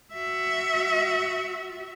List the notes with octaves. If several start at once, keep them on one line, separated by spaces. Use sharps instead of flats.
F#4 E5